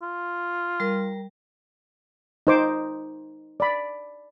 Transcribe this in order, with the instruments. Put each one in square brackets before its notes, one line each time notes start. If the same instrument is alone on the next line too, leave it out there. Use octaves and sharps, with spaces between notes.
[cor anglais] F4
[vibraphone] G3 A#4
[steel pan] D#4 C5 D6
D5 B5